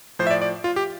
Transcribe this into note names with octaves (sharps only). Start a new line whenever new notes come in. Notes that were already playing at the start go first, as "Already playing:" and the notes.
A2 F3 C5
E5
D5
D5
F4
G4